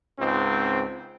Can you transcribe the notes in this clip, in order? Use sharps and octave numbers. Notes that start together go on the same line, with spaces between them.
C#2 G#2 C4